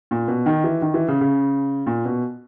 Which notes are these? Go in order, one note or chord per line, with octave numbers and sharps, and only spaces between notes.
A#2
B2
D#3
E3
D#3
E3
C#3
C#3
A#2
B2